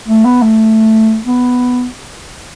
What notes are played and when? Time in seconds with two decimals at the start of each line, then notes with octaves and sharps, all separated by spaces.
0.08 A3
0.25 B3
0.42 A3
1.26 B3